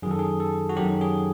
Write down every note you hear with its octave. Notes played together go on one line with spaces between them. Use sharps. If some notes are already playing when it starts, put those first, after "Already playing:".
F#2 D#3 F#3 G#4
A4
G#4
A4
F#4
F#2 D#3 F#3 G4
G#4